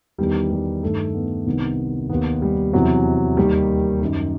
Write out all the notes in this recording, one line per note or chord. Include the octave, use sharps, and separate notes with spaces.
E2 D#3 G3
G3
G2 D#3 A3
B3
C2 C3 D#3 B3
D#2 D#3 B3
G3
E2 C3 E3 F#3
D#2 D#3 G3
F#2 D#3